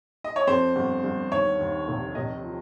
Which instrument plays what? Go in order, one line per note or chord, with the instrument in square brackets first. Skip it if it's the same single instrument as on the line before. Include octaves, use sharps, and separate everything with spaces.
[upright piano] D#5
C#5
F2 C5
G1
G1
D#2 C#5
D#2
F1
F1 D#5
F3